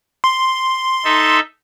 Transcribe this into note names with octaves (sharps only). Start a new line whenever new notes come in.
C6
D#4 A4 E5